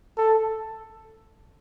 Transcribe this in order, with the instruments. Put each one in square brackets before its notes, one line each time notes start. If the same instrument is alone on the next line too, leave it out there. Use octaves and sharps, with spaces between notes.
[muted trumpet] A4